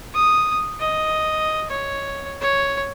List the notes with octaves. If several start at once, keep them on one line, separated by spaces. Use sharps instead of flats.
D#6
D#5
C#5
C#5